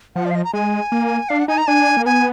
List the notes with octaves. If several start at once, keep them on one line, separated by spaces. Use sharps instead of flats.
F3 F#5
D5
F5
D#5
A#5
G#3 G#5
A#3
D4 F5
F#5
D#4 G#5
A#5
D4 G#5
A#3
B3 G#5